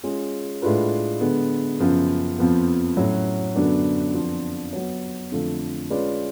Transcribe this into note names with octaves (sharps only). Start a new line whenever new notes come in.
G#3 C#4 F4 G#4
A2 G#3 D4 F4 B4
D3 G#3 B3
F#2 C#3 F3 B3
F2 F3 B3
A2 F#3 C#4 F#4 C#5
F#2 D3 F#3 B3 D4
F2 F3 B3 D4 F4
F#3 B3 F#4 C#5
F2 D3 F3 A3
G#3 C#4 F4 B4 D5